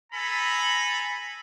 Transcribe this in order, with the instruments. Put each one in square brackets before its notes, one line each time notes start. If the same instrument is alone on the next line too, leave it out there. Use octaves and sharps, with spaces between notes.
[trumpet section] A4 G#5 A#5 B5